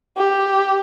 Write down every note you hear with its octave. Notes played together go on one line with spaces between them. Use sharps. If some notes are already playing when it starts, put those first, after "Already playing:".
G4